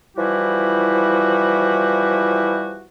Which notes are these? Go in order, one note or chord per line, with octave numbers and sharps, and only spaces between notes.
E3 F3 G3 E4 F#4 G4